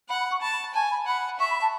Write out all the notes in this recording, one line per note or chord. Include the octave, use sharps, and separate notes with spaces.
F#5 B5
B5
C#6
A5 B5
G#5 A5
B5
F#5 B5
E5 C#6
B5
A5